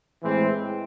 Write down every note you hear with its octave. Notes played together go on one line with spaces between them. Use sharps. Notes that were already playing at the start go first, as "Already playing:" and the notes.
A2 E3 G#3 C4